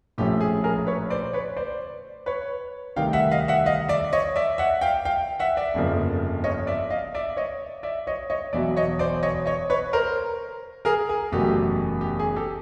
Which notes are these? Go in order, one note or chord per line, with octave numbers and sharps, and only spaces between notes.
A#1 A2 F3 A3 C#4 G4
G#4
G#4 A#4
B4 C#5
C5 D5
B4 C#5
C5 D5
B4 C#5
D2 C3 D#3 G3 F5 G5
E5 F#5
D#5 F5
E5 F#5
D#5 F5
D5 E5
C#5 D#5
D5 E5
E5 F#5
F5 G5
F5 G5
E5 F#5
D5 E5
G1 F2 C#3 F3 A#3
C#5 D#5
D5 E5
D#5 F5
D5 E5
C#5 D#5
D5 E5
C#5 D#5
C#5 D#5
E1 E2 B2 F#3 D5 E5
C#5 D#5
C5 D5
C#5 D#5
C#5 D#5
B4 C#5
A#4 C5
G#4 A#4
G#4
F#1 E2 B2 F#3 A3 G4
G4
G#4
G4 A4